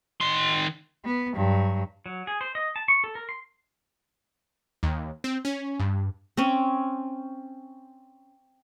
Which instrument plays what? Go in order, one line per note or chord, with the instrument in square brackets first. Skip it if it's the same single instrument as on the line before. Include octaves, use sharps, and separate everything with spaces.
[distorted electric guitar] D#3 C6
[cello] B3
G2 F#3
[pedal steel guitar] F#3
G#4
C5
D#5
A5
C#6
A4
A#4
C6
[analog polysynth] D#2
C4
C#4
G2
[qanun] C4 C#4